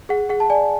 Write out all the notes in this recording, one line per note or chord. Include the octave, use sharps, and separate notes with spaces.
G#4 F#5
G#4 F#5
A5
D5 G#5